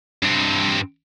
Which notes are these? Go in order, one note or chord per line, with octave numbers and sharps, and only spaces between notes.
G2 C4